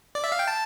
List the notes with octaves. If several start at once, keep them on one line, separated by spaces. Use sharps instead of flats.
D5
E5
F5
G5
A5